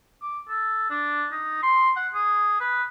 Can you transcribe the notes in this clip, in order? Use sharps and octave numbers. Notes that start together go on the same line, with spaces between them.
D6
A4
D4
D#4
C6
F#5
G#4
B4